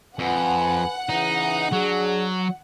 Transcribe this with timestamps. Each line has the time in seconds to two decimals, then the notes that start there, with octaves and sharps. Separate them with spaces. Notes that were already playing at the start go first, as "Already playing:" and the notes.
0.19 F2 B4 F#5 G#5
1.09 C#3 E3 D#4
1.72 F#3 D4 G#4